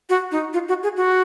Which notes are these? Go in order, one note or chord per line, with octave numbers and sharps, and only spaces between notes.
F#4
D#4
F4
F#4
G#4
F#4